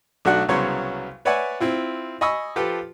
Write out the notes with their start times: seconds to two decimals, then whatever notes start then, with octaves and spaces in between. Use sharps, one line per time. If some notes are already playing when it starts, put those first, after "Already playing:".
0.25 B1 A3 D4 F#4 F#5 F#6
0.49 C2 C#3 F#3 B3 C#5 C6
1.25 B4 C#5 D5 E5 F#5 G#5
1.60 C4 E4 F4
2.21 D#5 G#5 B5 C#6 D#6 E6
2.56 F3 F4 G4 A4 B4